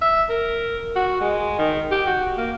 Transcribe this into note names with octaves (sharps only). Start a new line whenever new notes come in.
E5
A#4
F#4
G#3
D#3
G4
F#4
A#3